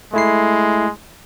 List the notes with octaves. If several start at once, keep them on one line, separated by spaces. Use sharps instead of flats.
G#3 A3 E4 C7